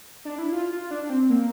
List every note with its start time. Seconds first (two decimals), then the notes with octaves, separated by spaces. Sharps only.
0.25 D4
0.39 E4
0.52 F4
0.72 F4
0.91 D4
1.09 C4
1.30 A#3